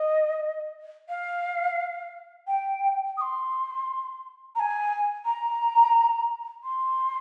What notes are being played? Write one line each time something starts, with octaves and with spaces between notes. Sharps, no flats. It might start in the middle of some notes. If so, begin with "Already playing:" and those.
Already playing: D#5
F5
G5
D#6
C6
A#5
G#5
A#5
C6